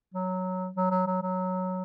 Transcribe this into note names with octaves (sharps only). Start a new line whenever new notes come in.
F#3
F#3
F#3
F#3
F#3